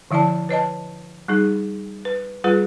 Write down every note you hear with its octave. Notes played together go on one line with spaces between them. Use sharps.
D3 F3 E4 D5 A5
B4 C#5 D#5 A5
G3 D#4 G#4
B4
G3 F4 G#4 B4